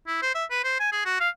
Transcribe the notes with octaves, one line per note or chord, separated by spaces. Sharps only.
E4
C5
E5
B4
C5
G#5
G#4
F#4
F5